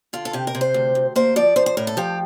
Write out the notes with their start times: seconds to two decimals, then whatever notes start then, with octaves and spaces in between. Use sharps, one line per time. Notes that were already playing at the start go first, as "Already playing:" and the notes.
0.13 D3 F4
0.25 A4
0.33 C3 G4
0.47 A#4
0.55 C3
0.61 C5
0.74 D2
0.95 D2
1.16 A#3 C5
1.36 F3 D5
1.56 F3 C5
1.66 C5
1.77 A2 A#4
1.87 A4
1.97 F3 G4